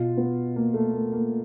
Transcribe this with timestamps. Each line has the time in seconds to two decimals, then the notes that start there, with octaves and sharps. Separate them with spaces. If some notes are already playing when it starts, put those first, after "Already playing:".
Already playing: B2 F4
0.17 B3
0.56 A#3
0.74 A3
0.94 A#3
1.13 A#3